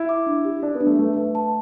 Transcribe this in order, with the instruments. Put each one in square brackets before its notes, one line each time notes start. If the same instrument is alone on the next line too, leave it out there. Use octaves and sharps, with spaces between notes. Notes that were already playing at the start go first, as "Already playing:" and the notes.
Already playing: [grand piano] E4
[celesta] D6
D4
G4
[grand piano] D4 [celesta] G4
[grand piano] B3
[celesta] D4
[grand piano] A3
[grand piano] A3 [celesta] B4
[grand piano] A3 [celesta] B4
[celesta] A5